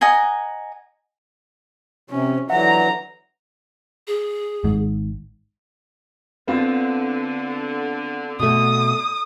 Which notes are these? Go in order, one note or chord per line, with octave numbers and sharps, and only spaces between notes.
D#5 F#5 G#5 A#5
C3 C#4
D3 E3 F#3 E5 F#5 A#5
G#4
G#1 G#2
D3 B3 C4 F4
B2 A3 D#6